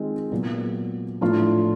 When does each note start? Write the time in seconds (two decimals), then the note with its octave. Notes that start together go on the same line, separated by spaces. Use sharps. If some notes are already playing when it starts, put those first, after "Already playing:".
Already playing: D#3 G#3 C4 F4
0.31 A#2 F#3 B3
1.21 A2 F3 A3 D4 F4